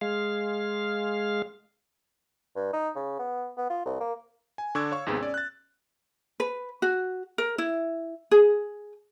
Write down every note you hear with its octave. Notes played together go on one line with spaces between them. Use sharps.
G#3 F5
G2
D#4
C#3
B3
B3
F4
C2
A#3
G#5
D3 D4 C#6 D6 E6 G#6
C#5 F5 C#6
D#2 G#2 C3 G#3 B3
C#4 D5
F#6 A6
B4
F#4
A#4
E4
G#4